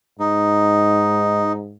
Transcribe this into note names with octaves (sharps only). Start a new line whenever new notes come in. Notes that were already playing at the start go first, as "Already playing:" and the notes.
G#2 D#4